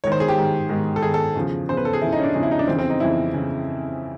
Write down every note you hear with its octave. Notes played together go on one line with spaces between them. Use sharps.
G#2 D#3 C#5
C5
G#4
G4
G#2 D#3
G#2 D#3
A4
G#2 D#3 G#4
A4
E2 C#3 F3
E2 C#3 F3 C5
B4
A4
G#4
E2 C#3 F3 E4
D#4
C#4
D4
E2 C#3 F3 D#4
E4
D#4
D4
F2 C#3 E3 C4
C4
D#4
F2 C#3 E3 E4
C#3 E3